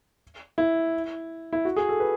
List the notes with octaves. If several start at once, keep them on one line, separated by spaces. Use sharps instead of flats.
E4
E4
F#4
G#4
A4
B4